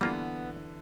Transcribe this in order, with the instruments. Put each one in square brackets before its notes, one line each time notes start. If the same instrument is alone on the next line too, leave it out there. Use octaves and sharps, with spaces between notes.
[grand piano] D3 E3 [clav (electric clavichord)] G3 A#3 F4 [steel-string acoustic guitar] B3